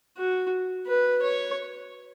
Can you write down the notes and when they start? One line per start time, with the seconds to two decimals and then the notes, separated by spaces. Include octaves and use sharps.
0.17 F#4
0.87 B4
1.22 C#5